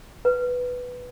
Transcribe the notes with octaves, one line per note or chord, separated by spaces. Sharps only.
B4